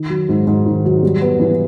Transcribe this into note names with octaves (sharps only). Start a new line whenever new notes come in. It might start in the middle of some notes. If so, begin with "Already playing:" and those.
Already playing: D#3
F#3
G#2
G#2
D#3
F#3
G3
B3
E3